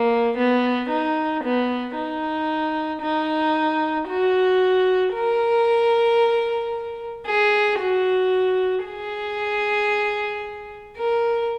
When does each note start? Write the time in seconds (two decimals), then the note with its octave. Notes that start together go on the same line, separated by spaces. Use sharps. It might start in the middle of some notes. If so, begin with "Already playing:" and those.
Already playing: A#3
0.37 B3
0.89 D#4
1.43 B3
1.96 D#4
3.01 D#4
4.08 F#4
5.14 A#4
7.25 G#4
7.79 F#4
8.84 G#4
10.97 A#4